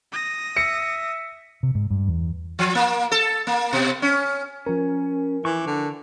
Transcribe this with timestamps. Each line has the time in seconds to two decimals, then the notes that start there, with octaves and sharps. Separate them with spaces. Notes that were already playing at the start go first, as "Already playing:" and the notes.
0.12 D#6 A#6
0.57 E5 C#7
1.63 C3
1.75 G#2
1.90 G2
2.08 E2
2.59 F3
2.75 A#3
3.12 A4
3.47 A#3
3.73 B2
4.02 C#4
4.66 F3 C#4 A#4
5.45 E3 C#6 D6
5.66 D3